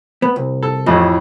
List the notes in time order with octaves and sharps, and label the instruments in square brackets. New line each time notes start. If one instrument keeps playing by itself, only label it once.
[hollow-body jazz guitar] B3
C2
[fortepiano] A4
[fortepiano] A1 F2 D#5 [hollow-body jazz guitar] A2